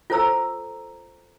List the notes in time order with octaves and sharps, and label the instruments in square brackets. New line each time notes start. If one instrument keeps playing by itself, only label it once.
[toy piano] F4 A4 C5 A#5 E6